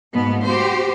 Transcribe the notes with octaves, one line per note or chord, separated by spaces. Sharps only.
G#2 B2 A#3 B3
F#4 G4 C5